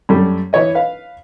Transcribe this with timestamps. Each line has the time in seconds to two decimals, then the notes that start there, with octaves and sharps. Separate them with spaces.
0.09 F#2 G3 A3
0.53 E3 E4 C#5 D#5
0.75 B4 F5